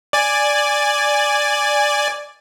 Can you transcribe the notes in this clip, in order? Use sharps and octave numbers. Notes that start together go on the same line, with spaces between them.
D5 G#5